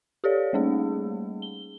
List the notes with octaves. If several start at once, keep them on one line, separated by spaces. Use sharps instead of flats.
G4 A4 C#5 D5 F5
G3 A3 A#3 C#4 D#4 G#4
G7